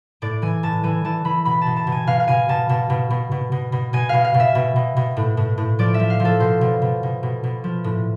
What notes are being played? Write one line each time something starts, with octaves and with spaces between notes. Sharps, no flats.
A2 D5
E3 G#5
A2 A5
E3 G#5
E3 A5
E3 B5
B2 B5
B2 A5
A5
B2
G#5
B2 F5
F5
B2 G#5
B2 A5
B2 A5
B2
B2
B2
B2
B2
B2 G#5
B2 F5
F5
B2
E5
B2
B2
B2
A2
A2
A2
F3 D5
E5
F3
F5
F3
A4
B2 C5
B2
B2
B2
B2
B2
F3
A2